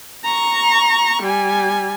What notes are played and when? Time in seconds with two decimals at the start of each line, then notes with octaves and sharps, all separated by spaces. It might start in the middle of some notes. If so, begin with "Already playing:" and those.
0.24 A#5 C#6
1.22 G3 G#5